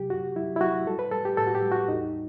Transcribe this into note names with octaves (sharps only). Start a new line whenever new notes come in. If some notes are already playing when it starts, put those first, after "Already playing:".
Already playing: C3 F#3 G4
F#2 F#4
F#3 E4
E4
F#3 F#4
G3 A4
B4
G3 A4
G4
A2 A4
F#4
G4
G3
F#4
E2 D#4